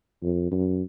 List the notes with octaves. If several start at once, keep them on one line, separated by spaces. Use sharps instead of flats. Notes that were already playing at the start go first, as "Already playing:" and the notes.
F2
F#2